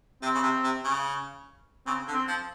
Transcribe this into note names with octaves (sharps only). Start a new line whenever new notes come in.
C3 C4
C#3
C3
C3
C#3
C#3 C4
D3
C4
F3